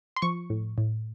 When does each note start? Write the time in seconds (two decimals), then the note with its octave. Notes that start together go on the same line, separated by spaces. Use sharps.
0.16 C6
0.22 F3 C#6
0.50 A2
0.78 A2